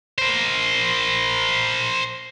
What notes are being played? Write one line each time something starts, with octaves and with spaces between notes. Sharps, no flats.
A#4 C5